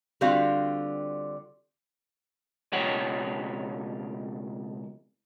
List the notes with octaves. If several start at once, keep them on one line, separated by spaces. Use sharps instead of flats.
D3 G3 C4 F4 F#4 F5
C#2 B2 F3 G4 C#5 F#5